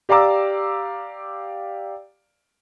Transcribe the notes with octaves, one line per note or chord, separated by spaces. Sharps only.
G4 D5 F5 A#5 D6 E6